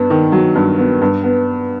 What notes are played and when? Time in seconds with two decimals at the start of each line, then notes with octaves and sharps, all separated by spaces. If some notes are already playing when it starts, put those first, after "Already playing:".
Already playing: G2 B3
0.10 D#3
0.32 F#3
0.55 G2
0.78 B3
1.01 G2
1.24 B3